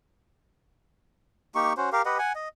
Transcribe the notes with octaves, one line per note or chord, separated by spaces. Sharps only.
A#3 D#4 G4 C#6
C#4 F#4 C5
G4 A#4 F5
G4 B4 D#5 F#5
F#5 G#5
D#5